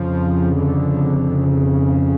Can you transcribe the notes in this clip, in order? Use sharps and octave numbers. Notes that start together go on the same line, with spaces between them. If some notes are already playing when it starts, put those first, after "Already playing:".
Already playing: F2 C#3 F3
D3
C#3